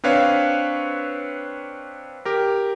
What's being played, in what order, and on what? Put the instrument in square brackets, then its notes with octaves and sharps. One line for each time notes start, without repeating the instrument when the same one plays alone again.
[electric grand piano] C4 D4 B4 C#5 F5
G4 A#4